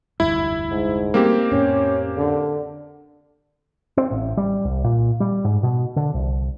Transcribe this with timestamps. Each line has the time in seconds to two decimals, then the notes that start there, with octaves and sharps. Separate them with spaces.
0.20 F1 D2 G2 E4
0.71 G#2
1.14 G3 A3 A#3 C4 C#4 G4
1.51 F2 A2 C#4
2.17 D3
3.97 C4
4.11 A1
4.37 G3
4.65 C2
4.84 A#2
5.20 G3
5.45 G#2
5.63 B2
5.96 D3
6.14 C2